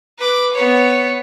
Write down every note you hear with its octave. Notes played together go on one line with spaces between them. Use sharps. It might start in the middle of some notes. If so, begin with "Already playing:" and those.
B4 D6
B3 C#5